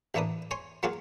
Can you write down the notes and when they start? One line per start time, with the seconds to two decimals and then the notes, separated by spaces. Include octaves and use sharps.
0.14 A1 A2 A#3 D4 B4 D#6
0.51 C#5 G#5 C6
0.83 F#3 A#3 F4 F#4 G#4